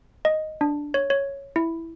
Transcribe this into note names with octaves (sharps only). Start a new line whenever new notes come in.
D#5
D4
C#5
C#5
E4